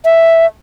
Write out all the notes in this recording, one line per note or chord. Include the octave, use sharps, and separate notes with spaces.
E5